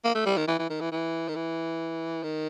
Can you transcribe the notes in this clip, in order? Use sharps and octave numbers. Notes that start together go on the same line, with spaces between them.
A#3
A3
G3
D#3
E3
E3
D#3
E3
E3
D#3
E3
D#3